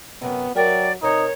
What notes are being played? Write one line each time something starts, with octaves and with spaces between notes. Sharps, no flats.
F#2 C3 B3
F#3 A#4 D5 E5 G5
C3 C4 D#4 A#4 C5 C#5